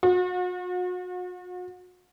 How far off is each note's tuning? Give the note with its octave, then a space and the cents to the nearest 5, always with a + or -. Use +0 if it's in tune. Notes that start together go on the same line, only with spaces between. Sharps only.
F#4 -40